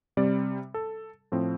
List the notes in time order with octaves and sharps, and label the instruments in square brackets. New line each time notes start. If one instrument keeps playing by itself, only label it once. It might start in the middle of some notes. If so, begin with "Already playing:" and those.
[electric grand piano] C3 G3 C4 D5
A4
A2 F3 C4